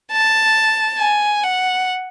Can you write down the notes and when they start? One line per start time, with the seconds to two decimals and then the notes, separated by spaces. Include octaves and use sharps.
0.11 A5
0.99 G#5
1.44 F#5